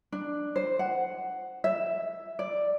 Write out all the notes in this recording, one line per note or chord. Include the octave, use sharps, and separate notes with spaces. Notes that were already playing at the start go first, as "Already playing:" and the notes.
D4
C5
F#5
E5
D5